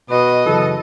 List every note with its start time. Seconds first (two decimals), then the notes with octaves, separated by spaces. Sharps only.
0.10 B2 B4 D#5
0.46 F#2 C#3 E3 A4